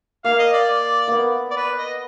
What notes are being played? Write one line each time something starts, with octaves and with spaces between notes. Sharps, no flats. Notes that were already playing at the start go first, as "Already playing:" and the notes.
A#3 F5
D#5
D5
A#3 B3
D5
B4
D#5